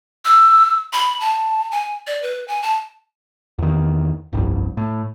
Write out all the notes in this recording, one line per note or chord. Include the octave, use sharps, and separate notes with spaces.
E6
B5
A5
G#5
D5
B4
G#5
A5
E2 D#3
F1 C2 G2
A2